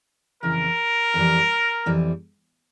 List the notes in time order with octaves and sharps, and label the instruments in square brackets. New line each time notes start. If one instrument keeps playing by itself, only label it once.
[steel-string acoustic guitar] F2 C#3 E3 [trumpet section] A#4
[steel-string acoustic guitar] F2 E3 G3
F2 E3 G3